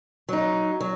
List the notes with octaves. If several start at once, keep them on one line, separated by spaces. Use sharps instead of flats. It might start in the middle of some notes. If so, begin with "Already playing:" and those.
F#3 D#4
F#3